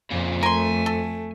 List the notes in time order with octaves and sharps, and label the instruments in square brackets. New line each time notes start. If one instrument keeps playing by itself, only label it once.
[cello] F2 [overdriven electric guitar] A#2 C#3
[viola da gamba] A3 [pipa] A#4 C6 [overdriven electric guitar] G#5
[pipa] A4